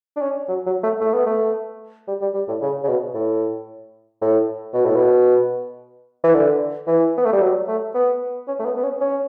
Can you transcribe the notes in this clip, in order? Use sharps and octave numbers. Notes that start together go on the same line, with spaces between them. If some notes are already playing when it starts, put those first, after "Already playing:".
D4
C#4
F#3
F#3
A3
A3
B3
A3
G3
G3
G3
A2
C#3
C#3
B2
A2
A2
B2
A2
B2
E3
D3
E3
B3
A3
G3
F#3
A3
B3
C#4
A3
B3
B3
C#4
C#4